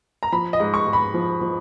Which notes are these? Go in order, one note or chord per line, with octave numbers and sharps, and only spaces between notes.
A#5
F3 B5
D#5
G#2
C#6
G#2
B5
F3
F3